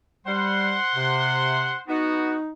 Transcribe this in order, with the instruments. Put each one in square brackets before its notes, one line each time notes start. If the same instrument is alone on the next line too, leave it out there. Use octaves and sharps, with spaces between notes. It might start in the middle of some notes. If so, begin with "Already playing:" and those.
[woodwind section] G3 [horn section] C5 F#5 C6
[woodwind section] C3
[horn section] B3 F#4 [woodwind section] D#4